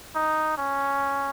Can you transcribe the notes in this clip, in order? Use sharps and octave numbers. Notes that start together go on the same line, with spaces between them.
D#4
C#4